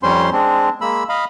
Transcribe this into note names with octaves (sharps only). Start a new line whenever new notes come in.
F2 G3 C#4 C5 C6
G#3 C4 D4
G#3 A#3 B5 E6
D#5 F5 B5